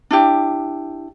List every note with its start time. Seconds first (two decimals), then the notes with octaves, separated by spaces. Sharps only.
0.11 D4 E4 G4